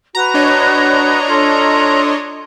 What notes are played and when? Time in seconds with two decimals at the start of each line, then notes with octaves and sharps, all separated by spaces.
0.15 F#4 B4 A#5
0.34 D4 C#5 D#5
1.28 F4 A4 C6